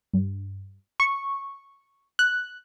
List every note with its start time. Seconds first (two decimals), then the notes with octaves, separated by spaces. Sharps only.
0.13 G2
1.00 C#6
2.19 F#6